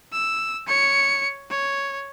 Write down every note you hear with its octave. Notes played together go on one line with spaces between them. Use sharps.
E6
C#5 C#7
C#5